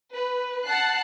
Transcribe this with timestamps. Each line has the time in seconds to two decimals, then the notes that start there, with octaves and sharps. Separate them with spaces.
0.14 B4
0.65 F#5 A5 F#6 C7